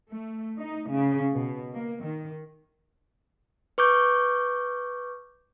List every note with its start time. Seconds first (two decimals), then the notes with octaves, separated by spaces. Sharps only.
0.10 A3
0.57 D#4
0.89 C#3
1.31 B2
1.73 A#3
2.03 D#3
3.78 B4 C#6 D6 G6